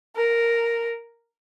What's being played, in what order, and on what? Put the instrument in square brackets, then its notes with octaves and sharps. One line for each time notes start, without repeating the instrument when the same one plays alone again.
[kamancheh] A#4